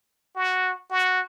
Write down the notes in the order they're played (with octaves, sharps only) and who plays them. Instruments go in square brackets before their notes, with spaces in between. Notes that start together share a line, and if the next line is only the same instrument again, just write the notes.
[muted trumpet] F#4
F#4